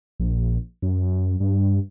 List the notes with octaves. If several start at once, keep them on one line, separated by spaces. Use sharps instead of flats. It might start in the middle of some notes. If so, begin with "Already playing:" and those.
A#1
F#2
G2